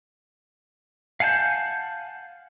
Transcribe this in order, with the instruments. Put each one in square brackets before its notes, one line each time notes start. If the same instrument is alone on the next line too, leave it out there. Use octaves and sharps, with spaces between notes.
[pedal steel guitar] F5 F#5 G#5 A5 G6